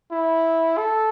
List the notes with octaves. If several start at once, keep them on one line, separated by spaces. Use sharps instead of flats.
E4
A4